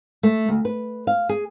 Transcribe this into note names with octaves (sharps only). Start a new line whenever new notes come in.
A3
D2
B4
F5
G#4